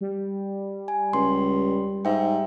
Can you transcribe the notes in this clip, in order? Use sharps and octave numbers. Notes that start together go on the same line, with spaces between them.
G3
G#5
C#2 C6
G#2 E5 G5